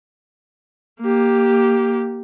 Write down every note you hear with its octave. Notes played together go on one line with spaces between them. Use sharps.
A#3 G4